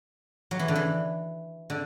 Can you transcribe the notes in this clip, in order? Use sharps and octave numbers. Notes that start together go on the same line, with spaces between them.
F#3
E3
D3
E3
D3